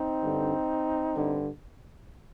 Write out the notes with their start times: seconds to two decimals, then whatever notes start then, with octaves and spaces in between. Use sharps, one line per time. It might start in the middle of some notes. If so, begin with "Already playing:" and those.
Already playing: C4 D#4
0.21 G2 D3
1.15 G2 D3